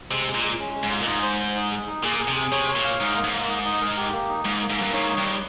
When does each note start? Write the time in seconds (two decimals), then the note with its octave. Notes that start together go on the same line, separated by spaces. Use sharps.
0.10 C3 G#3
0.27 G#3
0.34 A#2
0.43 G#3
0.59 C#4
0.74 G#3
0.83 G#2
0.91 F4
1.01 A#2
1.06 G#2 D#4
1.22 C5
1.40 C5
1.56 D#4
1.71 G#4
1.87 D#4
2.03 A#2 G#4
2.19 G#4
2.27 C3
2.36 G#4
2.52 C3 C#5
2.68 C#5
2.75 A#2
2.85 F5
3.00 G#2 D#4
3.17 A#3
3.24 G#2
3.33 A#3
3.48 D#4
3.64 D#4
3.81 A#4
3.97 G4
4.12 A#3
4.28 D#4
4.45 G#2 A#3
4.61 A#3
4.70 G#2
4.77 G2 A#3
4.93 G#2 C#5
5.10 D#4
5.17 G2
5.25 D#4